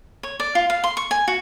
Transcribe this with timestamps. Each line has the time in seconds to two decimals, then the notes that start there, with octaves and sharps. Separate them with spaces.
0.23 C#5
0.40 D5
0.55 F4
0.70 F5
0.84 C6
0.97 C#6
1.11 G#5
1.28 F#4